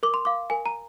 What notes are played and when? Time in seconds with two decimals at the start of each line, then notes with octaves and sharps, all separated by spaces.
0.03 A#4 D6
0.14 C6
0.25 F5 D6
0.50 A#4 G#5
0.66 A#5